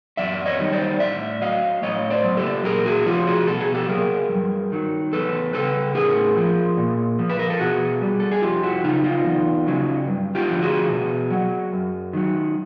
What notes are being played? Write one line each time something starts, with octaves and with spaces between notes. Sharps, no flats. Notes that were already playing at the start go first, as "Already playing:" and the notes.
F#2 D5 E5
C#5 D#5
D#3 G3
C5 D5
A2 D5 E5
F#3 D#5 F5
A2 C#5 D#5
C5 D5
F#3
G4 A4
A#2 G#4 A#4
F#4 G#4
F3 F4 G4
F#4 G#4
B2 A4
G#4
G4 A4
F#3 G#4 A#4
G2
D#3 F#3
E2 A4 B4
C#3 F3 A4 B4
A2 G#4 A#4
F3
A#2
F3
B4
A#4
A4
B2 F#4 G#4
G3
A4
G#4
F2 F4 G4
E4 F#4
C#3 F#3 D#4 F4
D#4 F4
E2
C#3 F#3
G2
F4 G4
D3 F3
F#4 G#4
B2
F#3
F#2
D#3 F#3